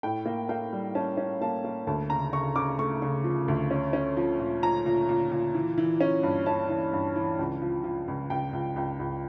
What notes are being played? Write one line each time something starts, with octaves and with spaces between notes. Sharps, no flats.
A2 G5
A#3
A#3 G5
G3
C#4 A5
C#4
A#3 A5
A#3
D2 A5
C#3 A#5
C#3 C#6
C#3 D6
A3 C#6
C#3
F3
D2
C#4
C#4
F3
A#2
F3 A#5
A#2
A#2
A#2
E3
E3
C#4
G2
C#4 A5
E3
G2
E3
C#2
F3
F3
C#2
C#2 G5
C#2
C#2 G5
C#2